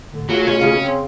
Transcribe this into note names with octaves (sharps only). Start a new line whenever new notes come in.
A2 D3
F#3 A3 F4 F#4 G#4
B2 C#4 C#5
C#3
C4